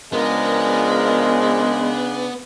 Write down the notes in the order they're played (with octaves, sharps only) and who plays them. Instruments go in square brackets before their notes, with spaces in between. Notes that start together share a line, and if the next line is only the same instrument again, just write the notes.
[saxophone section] C#3 D4 [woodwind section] F3 A#4 [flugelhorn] G#3 [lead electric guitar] B3